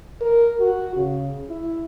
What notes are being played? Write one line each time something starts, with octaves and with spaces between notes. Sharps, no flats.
A#4
F#4
C#3
E4